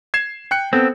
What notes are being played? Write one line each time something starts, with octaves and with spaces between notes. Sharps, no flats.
G#6 C7 E7
G5 F#6 C#7
B3 C4 A4